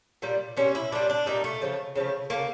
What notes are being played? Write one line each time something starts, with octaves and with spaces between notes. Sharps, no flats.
A#2 G3
A#2 G3 C#4
E4
A#2 G3 D4
D4
A#2 G3 D#4
A3
C#3 F3 A3
C#3 F3 A3
C#3 F3 A3 A#3